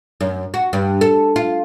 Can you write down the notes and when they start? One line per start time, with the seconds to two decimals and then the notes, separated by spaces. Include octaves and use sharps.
0.21 F#2
0.54 F#4
0.73 G2
1.01 A4
1.36 F4